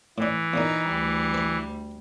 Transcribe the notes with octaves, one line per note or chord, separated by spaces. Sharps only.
A2 E3 D4
E2 A#2 D#4 D#5
D2 G3
B4 B5